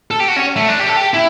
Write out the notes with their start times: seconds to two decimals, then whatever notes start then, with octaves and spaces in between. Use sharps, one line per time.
0.11 A4
0.20 G4
0.28 F#4
0.36 C#4
0.56 A3
0.68 D4
0.79 G4
0.89 A4
0.96 G4
1.14 E4